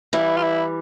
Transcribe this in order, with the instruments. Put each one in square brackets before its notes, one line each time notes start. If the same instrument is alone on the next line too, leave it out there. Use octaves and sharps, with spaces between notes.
[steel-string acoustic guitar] E3 G3 [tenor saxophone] E4
[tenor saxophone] F4
E4